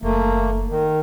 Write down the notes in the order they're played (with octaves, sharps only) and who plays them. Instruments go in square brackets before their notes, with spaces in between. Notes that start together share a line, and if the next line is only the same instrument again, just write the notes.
[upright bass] F#1 D#3 [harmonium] A3 A#3
[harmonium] D#3